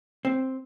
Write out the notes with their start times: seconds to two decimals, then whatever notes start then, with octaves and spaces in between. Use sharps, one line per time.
0.25 C4